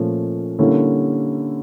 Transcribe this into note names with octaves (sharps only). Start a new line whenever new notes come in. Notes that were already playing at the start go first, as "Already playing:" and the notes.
Already playing: A#2 F3 A3 C#4
D3 G3 A#3 C#4 E4